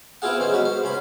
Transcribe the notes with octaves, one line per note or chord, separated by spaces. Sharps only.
B3 C4 E4 F4 G#4 F#5
D#3 C#4 C5
G#3 B3 F#4 B4
C5
C#2 C#4 B5